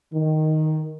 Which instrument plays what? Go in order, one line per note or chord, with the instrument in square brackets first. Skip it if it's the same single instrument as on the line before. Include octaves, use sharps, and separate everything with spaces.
[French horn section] D#3